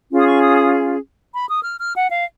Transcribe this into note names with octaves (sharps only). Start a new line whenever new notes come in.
C#4 F4 G#4
D#6
C#6
D#6
D#6
B5
D#6
F6
F6
F#5
F5